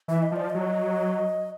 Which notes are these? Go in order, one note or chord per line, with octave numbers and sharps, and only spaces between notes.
E3 E5
D#5
F3 D5
F#3 D#5